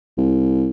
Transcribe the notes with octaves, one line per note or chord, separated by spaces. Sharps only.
C2